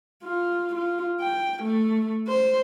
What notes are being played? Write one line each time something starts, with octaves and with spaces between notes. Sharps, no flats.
F4
F4
G5
A3
C5